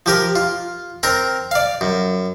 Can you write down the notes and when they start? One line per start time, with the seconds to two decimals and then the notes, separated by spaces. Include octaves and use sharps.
0.06 F3 G4 A#4
0.36 F4
1.03 C4 A#4 A#5
1.51 D5 F5
1.81 F#2